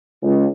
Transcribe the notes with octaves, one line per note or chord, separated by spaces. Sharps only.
C#2